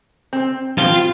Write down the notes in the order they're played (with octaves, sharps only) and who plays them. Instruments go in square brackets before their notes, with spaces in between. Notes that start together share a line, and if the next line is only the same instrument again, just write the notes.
[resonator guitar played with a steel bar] C4
[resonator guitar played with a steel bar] C4 [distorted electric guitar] F4